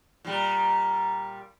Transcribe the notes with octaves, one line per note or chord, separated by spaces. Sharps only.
A#2 G3